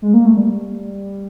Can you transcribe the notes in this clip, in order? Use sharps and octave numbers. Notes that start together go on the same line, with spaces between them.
G#3
A#3
A3
G3